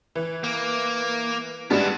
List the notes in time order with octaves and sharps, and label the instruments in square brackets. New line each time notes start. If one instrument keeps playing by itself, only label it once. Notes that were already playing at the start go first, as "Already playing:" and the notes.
[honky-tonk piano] E3
[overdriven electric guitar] A#3
[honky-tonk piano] G2 G3 G#3 [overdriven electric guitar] B3 E4